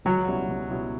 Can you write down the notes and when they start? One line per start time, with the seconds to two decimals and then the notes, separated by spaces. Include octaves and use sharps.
0.05 C#2 F#3
0.27 B2 G3 C#4 E4
0.48 C#2
0.70 B2 G3 C#4 E4